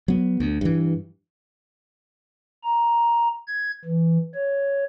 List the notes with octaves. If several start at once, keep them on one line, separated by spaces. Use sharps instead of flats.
F#3 B3
D2
G2 E3
A#5
G#6
E3
C#5